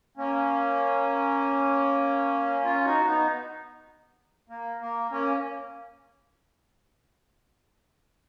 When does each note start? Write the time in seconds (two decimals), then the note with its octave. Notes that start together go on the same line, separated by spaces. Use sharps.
0.17 A#3 C#4
2.64 C#4 F4
2.85 D#4 F#4
3.05 B3 D#4
4.49 A#3
4.80 A#3
5.11 A#3 C#4